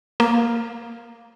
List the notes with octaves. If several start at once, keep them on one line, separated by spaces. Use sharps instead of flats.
A#3